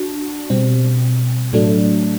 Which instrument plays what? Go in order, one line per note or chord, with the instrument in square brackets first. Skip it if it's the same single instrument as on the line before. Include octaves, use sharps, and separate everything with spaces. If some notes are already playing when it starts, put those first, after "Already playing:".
Already playing: [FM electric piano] D4 F#4
B2 G3 C4
A2 F#3 A3 D4